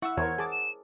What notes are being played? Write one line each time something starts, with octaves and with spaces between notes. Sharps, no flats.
E4 E5 F#5 C#6 E6
E2 A#4 C5 C#5 G#6
G#4 A5 D6
E7